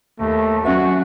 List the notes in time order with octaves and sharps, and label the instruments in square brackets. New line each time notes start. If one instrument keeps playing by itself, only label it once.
[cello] D#2 [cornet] A3
[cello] F#3 [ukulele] C#4 D5 E5 [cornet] F#4